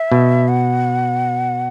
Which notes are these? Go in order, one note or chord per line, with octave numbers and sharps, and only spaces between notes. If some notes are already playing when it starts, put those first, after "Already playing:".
Already playing: E5
B2
F#5